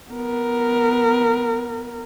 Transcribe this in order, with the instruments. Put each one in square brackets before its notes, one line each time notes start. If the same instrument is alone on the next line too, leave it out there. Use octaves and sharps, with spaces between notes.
[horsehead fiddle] B3 A#4